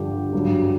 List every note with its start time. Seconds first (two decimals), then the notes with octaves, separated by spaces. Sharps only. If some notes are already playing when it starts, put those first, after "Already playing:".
Already playing: G2 D3 F3 G4
0.33 G2 D3 F#3